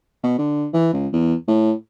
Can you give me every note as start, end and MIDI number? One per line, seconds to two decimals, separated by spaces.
0.23 0.34 47
0.38 0.67 50
0.73 0.90 52
0.93 1.08 37
1.13 1.34 40
1.48 1.73 45